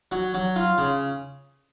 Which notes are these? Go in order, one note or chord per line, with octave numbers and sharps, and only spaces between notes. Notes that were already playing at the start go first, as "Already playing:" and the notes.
F#3
F#3
F4
C#3